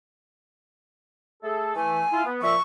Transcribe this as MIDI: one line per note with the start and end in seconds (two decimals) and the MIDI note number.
1.43 1.75 57
1.43 1.75 68
1.43 1.75 69
1.76 2.02 52
1.76 2.02 57
1.76 2.23 80
2.12 2.25 64
2.12 2.25 65
2.25 2.41 59
2.42 2.55 46
2.42 2.55 53
2.42 2.55 76
2.42 2.62 85